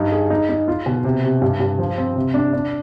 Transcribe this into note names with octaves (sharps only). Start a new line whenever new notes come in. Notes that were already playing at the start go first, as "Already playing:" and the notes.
Already playing: G2 D#4
G#4
D#4
D#4
F4
B2
C3
C3
G2
G2
F3
C4
C3
D4
D4